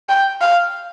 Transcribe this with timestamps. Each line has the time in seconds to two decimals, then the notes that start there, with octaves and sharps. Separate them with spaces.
0.09 G5
0.41 F5